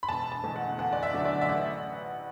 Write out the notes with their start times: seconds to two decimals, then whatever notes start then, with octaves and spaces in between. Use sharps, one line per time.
0.03 B5
0.09 E1 A5
0.32 A5
0.44 E2 B2 A3
0.56 F#5
0.79 E2 F#5
0.93 D5
1.03 E5
1.13 D3 F#3 A3
1.25 D5
1.41 E5
1.48 A1 F#5